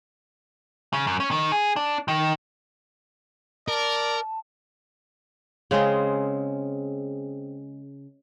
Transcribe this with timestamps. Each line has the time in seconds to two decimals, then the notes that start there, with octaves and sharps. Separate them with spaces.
0.93 C#3
1.07 F#2
1.20 C#4
1.31 D#3
1.52 G#4
1.76 D4
2.08 D#3
3.68 A#4 D5 A5
5.71 C#3 G#3 C4 C5